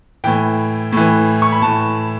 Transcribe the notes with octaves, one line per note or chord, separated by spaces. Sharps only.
A2 E3 G5
A2 E3
C#6
B5
A2 E3 A5